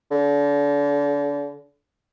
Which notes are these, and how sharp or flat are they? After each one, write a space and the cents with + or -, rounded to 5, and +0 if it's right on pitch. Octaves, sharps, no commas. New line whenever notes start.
D3 -35